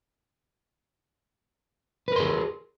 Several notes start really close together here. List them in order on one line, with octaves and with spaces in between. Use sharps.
B4 A#4 C6 G#4